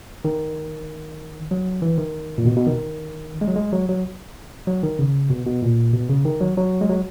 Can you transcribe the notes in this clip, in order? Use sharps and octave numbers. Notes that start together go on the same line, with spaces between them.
D#3
F#3
E3
D#3
A#2
B2
B2
D#3
G#3
F#3
G#3
F#3
F#3
F#3
D#3
C#3
B2
B2
A#2
B2
C#3
D#3
F#3
F#3
G#3
F#3